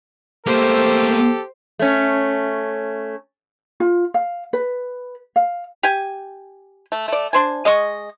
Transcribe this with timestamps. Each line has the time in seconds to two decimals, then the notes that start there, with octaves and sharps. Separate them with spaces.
0.46 A3 A#3 G4 A4 C5
1.79 A3 C#4
3.80 F4
4.14 F5
4.53 B4
5.36 F5
5.83 G4 G#5
6.92 A3
7.08 A3 D5
7.33 D4 C5 G#5
7.65 G#3 D#5 C#6